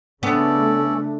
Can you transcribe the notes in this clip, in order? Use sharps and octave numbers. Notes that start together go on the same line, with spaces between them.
C#3 A3 B3 C#4 D4 A4 D5